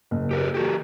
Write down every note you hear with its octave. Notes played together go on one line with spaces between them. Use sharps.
F#1
G4 A#4 B4
E3 F#4 G4 A4